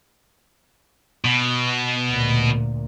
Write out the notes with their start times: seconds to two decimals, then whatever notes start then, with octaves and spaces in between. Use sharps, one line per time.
1.25 B2
2.10 D2 A#2